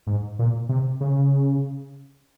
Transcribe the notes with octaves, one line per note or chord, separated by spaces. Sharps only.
G#2
A#2
C3
C#3